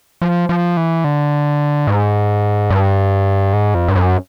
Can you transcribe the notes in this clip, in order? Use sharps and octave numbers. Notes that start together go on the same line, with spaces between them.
F3
F3
E3
D3
G#2
G2
G#2
F2
G2
F#2